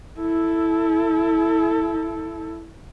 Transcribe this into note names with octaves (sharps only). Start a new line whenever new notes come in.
E4 A4